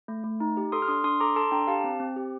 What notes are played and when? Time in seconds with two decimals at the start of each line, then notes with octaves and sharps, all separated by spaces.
0.08 A3
0.24 A3
0.40 D#4
0.57 G4
0.72 A4 C6 D#6
0.82 F6
0.88 D4 C6 D#6
1.04 D4 C6 D#6
1.20 A4 A#5 D6
1.36 A4 A5 C6
1.52 D4 G5 A#5
1.67 G4 F5 A5
1.84 C4
2.00 C4
2.16 G4